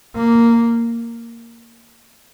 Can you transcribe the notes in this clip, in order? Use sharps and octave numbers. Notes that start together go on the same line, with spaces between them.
A#3